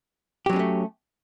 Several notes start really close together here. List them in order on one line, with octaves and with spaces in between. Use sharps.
G4 F#3 C#4 G#3 A3